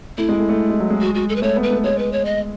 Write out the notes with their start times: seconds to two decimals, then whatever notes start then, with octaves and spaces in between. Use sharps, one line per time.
0.18 A3 E4
0.29 G#3
0.39 A3
0.49 A3
0.70 G#3
0.80 F#3
0.90 G#3
1.01 F#4
1.15 F#4
1.29 A4
1.36 B4
1.42 A3 C#5
1.56 B3
1.63 B4
1.70 A3
1.84 G#3 C#5
1.99 B4
2.12 C#5
2.25 D#5